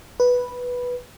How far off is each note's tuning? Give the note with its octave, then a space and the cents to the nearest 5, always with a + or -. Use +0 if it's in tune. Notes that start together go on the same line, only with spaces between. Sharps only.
B4 -5